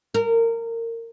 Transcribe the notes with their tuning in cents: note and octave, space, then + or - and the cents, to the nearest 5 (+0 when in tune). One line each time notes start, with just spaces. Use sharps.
A#4 -25